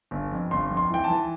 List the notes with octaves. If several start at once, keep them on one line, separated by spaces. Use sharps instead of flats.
G1
F2
G1 C6
F2
C6
E3 G5
A5
E3